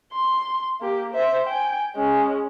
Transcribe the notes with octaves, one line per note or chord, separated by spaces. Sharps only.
C6
A#3 G4
C5 E5
G5 G#5
G#3 C#4